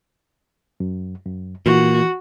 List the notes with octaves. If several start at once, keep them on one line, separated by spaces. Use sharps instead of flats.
F#2
F#2
A#2 E3 F#4